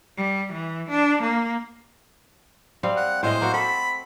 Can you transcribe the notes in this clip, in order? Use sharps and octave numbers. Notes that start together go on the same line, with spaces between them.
G3
E3
D4
A#3
G3 C4 F5
F#5
A2 G#3 C5 D#5
A#3 C4 F#4
A4 B5